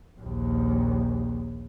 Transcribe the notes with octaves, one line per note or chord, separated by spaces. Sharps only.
A#1 D#2